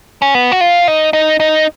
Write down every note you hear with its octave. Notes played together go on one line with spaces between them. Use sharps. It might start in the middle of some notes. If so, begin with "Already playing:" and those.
C#4
B3
F#4
F4
D#4
D#4
D#4